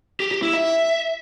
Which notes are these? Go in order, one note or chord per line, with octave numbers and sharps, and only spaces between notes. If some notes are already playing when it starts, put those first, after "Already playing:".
G4
G4
E4
E5